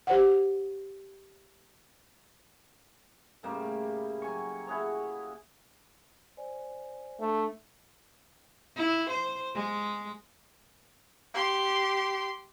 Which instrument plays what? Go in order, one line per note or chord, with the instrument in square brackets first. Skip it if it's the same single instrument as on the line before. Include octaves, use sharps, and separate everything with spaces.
[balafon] G4 C5 D5 F#5
[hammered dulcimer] A2 C#3 G3 A#3
F#3 G#5 C#6
E4 F#4 G#4 C#5
[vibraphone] C5 D5 G#5
[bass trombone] A3 [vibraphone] D4
[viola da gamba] E4
C5
G#3
[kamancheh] G4 C6